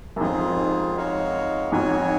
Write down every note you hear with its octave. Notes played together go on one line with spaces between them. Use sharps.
F#2
F2 G#2 F4 G#4 C5
G#3 D#4 F#4 C#5 F5
F2 G#2 F#4 C#5 G#5